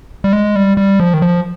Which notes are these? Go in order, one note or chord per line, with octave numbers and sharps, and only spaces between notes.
G3
G#3
G3
G3
F3
D#3
F3